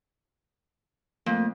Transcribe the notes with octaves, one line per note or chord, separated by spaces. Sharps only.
F2 A3 A#3